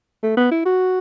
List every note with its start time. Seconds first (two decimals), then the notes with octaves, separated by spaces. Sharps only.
0.23 A3
0.37 B3
0.51 E4
0.65 F#4